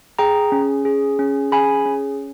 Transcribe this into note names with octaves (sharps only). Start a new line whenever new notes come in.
G#4 G5 A#5
C#4
G#4
C#4
G#4 G#5 B5
C#4